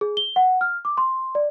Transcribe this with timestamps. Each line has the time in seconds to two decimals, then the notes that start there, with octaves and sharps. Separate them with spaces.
0.01 G#4
0.17 G7
0.36 F#5
0.61 F6
0.85 D6
0.98 C6
1.35 D5